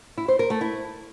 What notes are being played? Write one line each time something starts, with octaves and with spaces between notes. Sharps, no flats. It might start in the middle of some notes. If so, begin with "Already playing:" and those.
E4
C5
A#4
A3
E4